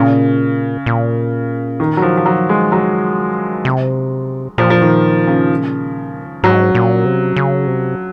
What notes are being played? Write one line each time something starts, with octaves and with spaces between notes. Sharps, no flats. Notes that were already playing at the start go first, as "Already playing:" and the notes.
Already playing: A#2 C#3
A#2
D#3
F#3
F3
F3
F#3
G#3
F#3
C3
A#2 F3
F3
D#3
C#3
G#2 F#3
A#2
C3
C#3
C3